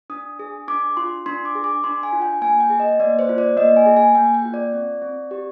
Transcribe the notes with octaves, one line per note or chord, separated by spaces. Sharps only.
D4 D#6
G#4
D4 D6
F4 C6
D4 C6
D6
G#4
D6
D4 C6
G#5
F4
G5
A#3 G#5
G5
G#4
D#5
A#3 D5
C5
F4
D5
A#3 D#5
G#5
G#4
G#5
A#3 G5
G5
F4
D5
C4
C4
G4